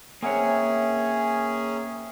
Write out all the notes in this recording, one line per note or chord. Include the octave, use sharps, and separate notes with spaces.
A#3 C4 C#4 G#4 C#5 E5 F#5